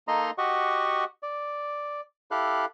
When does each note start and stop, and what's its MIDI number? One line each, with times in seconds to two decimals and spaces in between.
0.08 0.31 58
0.08 0.31 63
0.08 0.31 69
0.08 0.31 75
0.08 0.31 82
0.08 0.31 84
0.38 1.04 66
0.38 1.04 67
0.38 1.04 75
0.38 1.04 78
0.38 1.04 85
1.23 2.01 74
2.31 2.65 64
2.31 2.65 67
2.31 2.65 69
2.31 2.65 77
2.31 2.65 90